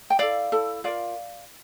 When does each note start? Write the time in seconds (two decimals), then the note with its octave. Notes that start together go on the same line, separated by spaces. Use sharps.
0.10 G5
0.19 E4 A4 D5 F5
0.52 E4 A4
0.84 F4 A#4 D5 F5